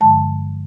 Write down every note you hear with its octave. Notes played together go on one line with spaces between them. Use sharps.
G2 D3 F3 G#3 A5